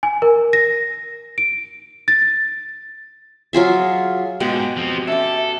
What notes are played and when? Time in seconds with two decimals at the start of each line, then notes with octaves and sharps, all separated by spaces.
0.03 G#5
0.22 A#4
0.53 A#6
1.38 D7
2.08 A6
3.53 F#3 F4 G#4 E5
4.40 G#2 B2 G#3 G4
4.77 F3 C4
5.08 C#4 G4 A4 E5